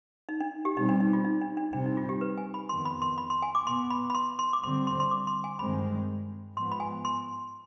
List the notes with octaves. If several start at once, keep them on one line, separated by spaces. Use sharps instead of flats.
D#4
D4
G4
B2 G3 C4 D#4
D4
D#4
F4
D#4
D4
D4
C3 G3 C4 D4
D#4
F4
G4
B4
G#5
B5
F2 D#3 B3 C6
B5
C6
B5
C6
G#5
D6
B2 B3 C6
B5
B5
C6
C6
D6
D3 G3 C4 C6
C6
C6
D6
C6
G#5
G2 D#3 G#3 C4 B5
G#2 F3 G#3 B3 C6
B5
G#5
C6